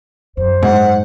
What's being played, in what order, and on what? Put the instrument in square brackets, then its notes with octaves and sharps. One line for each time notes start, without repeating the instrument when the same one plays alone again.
[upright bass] F#2 [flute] C5
[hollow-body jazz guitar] G#2 [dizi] F#5